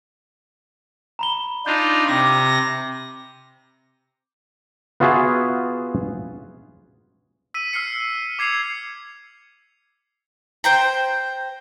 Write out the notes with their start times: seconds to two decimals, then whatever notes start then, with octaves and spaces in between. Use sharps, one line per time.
1.19 A#5 B5 G7
1.66 D4 D#4 F4 G6
2.08 C3 D6 A#6
5.00 B3 F4 F#4 G#4 E5
7.54 E6 B6 D#7
7.73 E6 F6 C7 C#7
8.39 D6 G#6 C7 C#7 F7
10.64 C5 G5 A#5